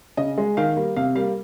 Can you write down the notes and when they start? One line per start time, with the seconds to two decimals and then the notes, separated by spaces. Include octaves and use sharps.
0.17 C#3 D#5
0.38 G#3
0.57 D#3 F5
0.76 G3 A#3
0.96 C3 F5
1.15 G3 A#3 F5